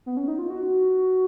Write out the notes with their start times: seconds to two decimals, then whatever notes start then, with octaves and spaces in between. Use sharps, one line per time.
0.06 B3
0.17 C#4
0.28 D#4
0.39 F4
0.50 F#4